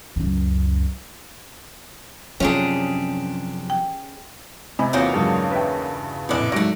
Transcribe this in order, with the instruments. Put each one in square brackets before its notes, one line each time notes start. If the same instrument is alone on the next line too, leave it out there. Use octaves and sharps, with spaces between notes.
[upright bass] C#2 F#2
[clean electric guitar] F#2 C3 D4 [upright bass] F3 [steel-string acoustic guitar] C#4 G4 G#4
[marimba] G5
[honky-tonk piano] C3 [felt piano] D#5 G#5 B5
[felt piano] E2 F4 F#4 [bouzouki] A#3 C#4 D#4
[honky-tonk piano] G2 C#3 [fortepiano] F#3 G#3
[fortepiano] B4 E5 G5
[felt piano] A#1 F2 A2 [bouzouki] B3 D4
[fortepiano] G#2 F#3 D#4 [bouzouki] A3 F#4 [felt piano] A#6 D7